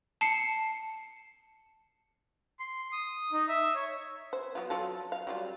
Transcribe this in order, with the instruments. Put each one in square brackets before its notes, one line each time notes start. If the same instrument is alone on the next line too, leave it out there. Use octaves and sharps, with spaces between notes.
[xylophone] A5 C7 C#7
[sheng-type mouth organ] C6
D#6
D#4
E5
C#5
[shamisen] C5
F#3 B3 F4
F#3 F4 A4
F5
F#3 G3 F4